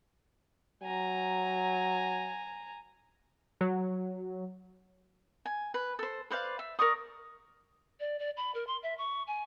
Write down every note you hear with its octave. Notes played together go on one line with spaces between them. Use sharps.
F#3 G#5 A#5
F#3
G#5
B4
A4 C5
B4 C5 D5 F5
E5
A#4 D5 C#6 D#6
D5
D5
B5
A#4
C6
E5
C#6
G#5